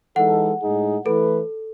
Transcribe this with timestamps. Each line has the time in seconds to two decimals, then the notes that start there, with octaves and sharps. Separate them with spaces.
0.16 E3 G#3 D#4 A4 F#5
0.61 A2 G#3 D#4 G#4
1.05 E3 A3 E4 A4 B4